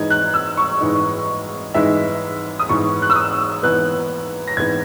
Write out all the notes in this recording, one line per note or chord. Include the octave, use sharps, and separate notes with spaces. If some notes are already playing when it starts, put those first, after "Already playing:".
Already playing: G#2 E3 G#3 D#4 G#6
F#6
E6
C#6
G#2 E3 G#3 D#4
G#2 E3 G#3 D#4 E5
D#6
G#2 E3 B3 C#6
F#6
E6
D#6
G#2 E3 B3 F#6
A#6
G#2 E3 B3 G#6